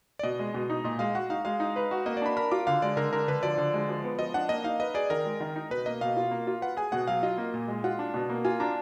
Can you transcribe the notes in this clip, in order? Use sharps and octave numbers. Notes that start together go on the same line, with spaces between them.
D5
B2 D#5
G#3
B2
D#4
A#2 D#5
G#3 F5
F#4 F#5
D#4 F5
G#3 F5
D#4
B4
F#4
A#3 D#5
D5
D4 B5
A#4 B5
F4 D6
D3 F5
G#3 D5
D3 A#4
D4 A#4
D3 B4
F3 D5
D3
G#3
F3
B3
F3 D#5
D4 F#5
A#3 D#5
D#4 F5
B4 D#5
G#4 D5
D#3 A#4
G#3
D#3
D#4
B2 B4
A#3 D#5
B2 F5
F4
A#3
F4
B4 F#5
G#4 G#5
B2 F#5
F#3 F5
F4 D#5
A#3
A#2
G#3
F4 F#5
D4
B2
A#3
F4 G#5
D4 A#5